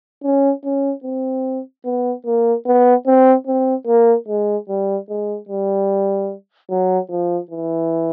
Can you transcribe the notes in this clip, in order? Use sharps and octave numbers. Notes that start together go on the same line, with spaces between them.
C#4
C#4
C4
B3
A#3
B3
C4
C4
A#3
G#3
G3
G#3
G3
F#3
F3
E3